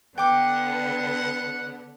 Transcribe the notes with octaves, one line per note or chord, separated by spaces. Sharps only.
D3 B3 F#5 G5 D6